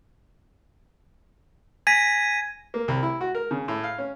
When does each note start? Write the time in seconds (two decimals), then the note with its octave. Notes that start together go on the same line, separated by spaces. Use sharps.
1.87 G#5 G#6 A#6 B6 D#7
2.74 A#3
2.88 C2
3.03 E4
3.21 F#4
3.35 A#4
3.51 C#3
3.68 A2
3.84 F5
3.98 C#4